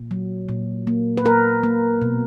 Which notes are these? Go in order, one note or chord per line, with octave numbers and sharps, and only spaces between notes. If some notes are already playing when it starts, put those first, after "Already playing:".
Already playing: A#2
F#3
A#2
A#3
B4
A#3 A#4
A#3
B2